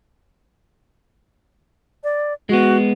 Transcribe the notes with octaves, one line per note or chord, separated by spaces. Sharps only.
D5
G#3 B3 F#4